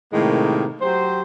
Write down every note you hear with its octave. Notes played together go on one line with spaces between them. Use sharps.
A2 C3 D#3 G#3 A#3
F#3 G4 C5